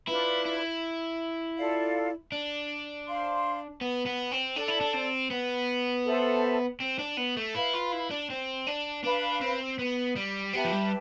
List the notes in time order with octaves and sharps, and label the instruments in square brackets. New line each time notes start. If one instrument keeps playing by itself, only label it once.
[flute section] D4 F4 B4 [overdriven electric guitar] E4
[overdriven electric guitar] E4
[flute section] F4 A4 D5 F5
[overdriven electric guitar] D4
[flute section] C5 F5 C6
[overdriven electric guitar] B3
B3
C4
[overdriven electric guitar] D4 [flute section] A4 D5 A5
[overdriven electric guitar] E4
D4
C4
B3
[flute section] A4 C5 E5 A5
[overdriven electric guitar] C4
D4
B3
A3
[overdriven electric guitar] E4 [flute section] B4 F5 B5
[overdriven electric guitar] F4
E4
D4
C4
D4
[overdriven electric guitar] D4 [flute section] B4 F5 B5
[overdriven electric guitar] C4
B3
G3
[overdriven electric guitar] B3 [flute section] G4 B4 E5 A5
[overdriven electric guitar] F3
G3